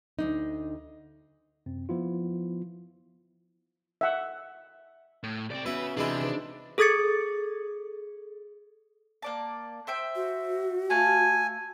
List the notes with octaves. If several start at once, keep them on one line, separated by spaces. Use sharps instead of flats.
D2 D4 D#4
F#2 C3 C4
F3 B3 E4 F4
E5 F#5
A2
C2 C4 D5
C#3 B3 E4 F#4 B4
C3 E3 G#3 D4 E4 G#4
D#3 B4 C5
G#4 A4 D#6 G#6 A6 C#7
A#3 D5 A5
C5 E5 G5
F#4
A3 F5 G#5 A5